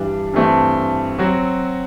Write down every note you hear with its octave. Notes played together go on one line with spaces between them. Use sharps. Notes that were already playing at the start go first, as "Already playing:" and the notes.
Already playing: G2 E3 G3 D4
G2 E3 A3 C4
F#3 C4 F#4